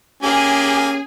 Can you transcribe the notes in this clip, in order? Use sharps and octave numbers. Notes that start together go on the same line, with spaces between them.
A#3 C#4 G4 G#4 G#5